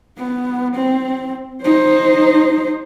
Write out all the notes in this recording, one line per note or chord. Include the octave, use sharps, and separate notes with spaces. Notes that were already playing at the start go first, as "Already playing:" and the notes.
B3
C4
D#4 C5